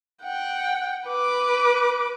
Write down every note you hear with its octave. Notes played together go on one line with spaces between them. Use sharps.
F#5 G5
B4 D6